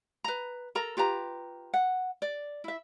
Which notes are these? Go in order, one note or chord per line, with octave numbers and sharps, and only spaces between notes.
B4 A#5
A4 A#4 A#5
F4 G4 B4 A#5
F#5
D5
E4 E5